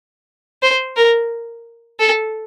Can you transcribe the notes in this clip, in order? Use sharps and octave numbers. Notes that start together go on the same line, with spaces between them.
C5
A#4
A4